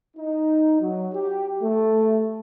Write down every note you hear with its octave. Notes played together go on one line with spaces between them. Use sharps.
D#4
F#3
G4
A3